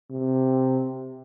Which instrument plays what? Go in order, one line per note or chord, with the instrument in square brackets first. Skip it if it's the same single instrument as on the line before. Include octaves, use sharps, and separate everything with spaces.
[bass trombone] C3